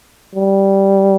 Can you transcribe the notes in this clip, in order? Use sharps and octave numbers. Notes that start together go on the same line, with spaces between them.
G3